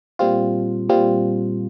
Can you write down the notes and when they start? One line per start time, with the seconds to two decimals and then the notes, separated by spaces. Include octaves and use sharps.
0.19 A#2 G3 C4 F4
0.89 A#2 G3 C4 F4